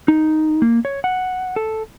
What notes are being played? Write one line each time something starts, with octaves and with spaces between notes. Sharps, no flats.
D#4
A#3
C#5
F#5
A4